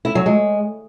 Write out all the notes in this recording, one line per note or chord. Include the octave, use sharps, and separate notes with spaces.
E4
F#3
G#3